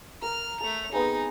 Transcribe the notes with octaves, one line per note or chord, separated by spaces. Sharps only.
A#4 F6
A3 A4 F7
B3 C4 D#4 G#4